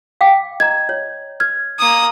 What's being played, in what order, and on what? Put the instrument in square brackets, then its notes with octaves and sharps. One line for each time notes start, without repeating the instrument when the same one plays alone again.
[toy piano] F5 G5 D6
[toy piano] D#5 A#5 [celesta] G#6
[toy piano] C#5
[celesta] F6 G#6
[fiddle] A#3 D#6